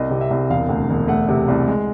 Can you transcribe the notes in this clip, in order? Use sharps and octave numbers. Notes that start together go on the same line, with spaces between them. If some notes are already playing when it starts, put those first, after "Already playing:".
Already playing: C2 D#5
C3
E5
C2
E1 F5
D2
E1
A3 F#5
C3
C2
G#3